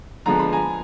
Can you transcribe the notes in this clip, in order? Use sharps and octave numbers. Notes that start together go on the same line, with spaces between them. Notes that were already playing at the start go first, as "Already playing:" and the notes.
D3 F3 G#3 B3 A#5
B5
G#5 A#5